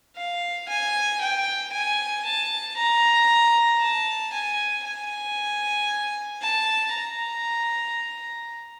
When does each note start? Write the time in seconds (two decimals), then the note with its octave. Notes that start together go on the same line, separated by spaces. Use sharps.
0.16 F5
0.68 G#5
1.20 G5
1.72 G#5
2.25 A5
2.77 A#5
3.81 A5
4.33 G#5
4.85 G#5
6.42 A5
6.93 A#5